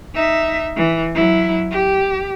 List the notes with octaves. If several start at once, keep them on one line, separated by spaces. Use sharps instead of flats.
D#4 E5
E3
F#3 E4
G4